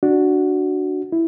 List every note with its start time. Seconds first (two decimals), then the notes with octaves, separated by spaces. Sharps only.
0.03 D4 F#4
1.12 E4